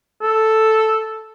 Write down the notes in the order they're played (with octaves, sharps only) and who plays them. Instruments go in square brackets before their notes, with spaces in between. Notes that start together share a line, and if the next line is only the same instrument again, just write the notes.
[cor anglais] A4